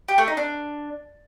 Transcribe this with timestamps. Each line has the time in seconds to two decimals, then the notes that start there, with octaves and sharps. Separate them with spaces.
0.08 G4
0.18 A3
0.28 D#4
0.37 D4